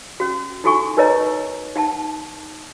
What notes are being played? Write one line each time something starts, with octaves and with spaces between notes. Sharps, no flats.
C#4 F#4
D#4 E4 F#4 A4 G#5 C#6
D#4 A#4 B4 C#5 D#5 A#5
D#4 F#5 A5